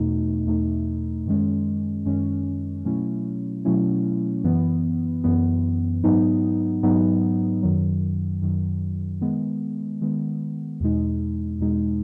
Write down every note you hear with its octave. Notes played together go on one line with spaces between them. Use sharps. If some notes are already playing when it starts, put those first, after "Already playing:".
Already playing: E2 B2 A3 D#4
E2 B2 A3 D#4
F#2 D#3 G#3 C#4
F#2 D#3 G#3 C#4
B2 F#3 A3 C#4 E4
B2 F#3 A3 C#4 E4
F#2 E3 B3
F#2 E3 B3
G#2 F#3 B3 D#4
G#2 F#3 B3 D#4
F#2 D#3 F#3
F#2 D#3 F#3
D#3 G#3 B3
D#3 G#3 B3
E2 B2 G#3 D#4
E2 B2 G#3 D#4